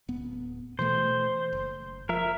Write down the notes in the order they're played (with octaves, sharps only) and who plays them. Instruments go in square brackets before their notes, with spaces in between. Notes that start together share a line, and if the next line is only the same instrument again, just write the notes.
[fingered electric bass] D1 B3
[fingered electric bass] B2 E3 A3 [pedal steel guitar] C5
[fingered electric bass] F#1
[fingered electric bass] F3 [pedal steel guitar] A#4 E5